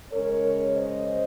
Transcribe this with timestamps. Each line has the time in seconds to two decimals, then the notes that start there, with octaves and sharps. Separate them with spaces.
0.11 C#3 G#3 C#4 A#4 C#5
0.75 C5 D#5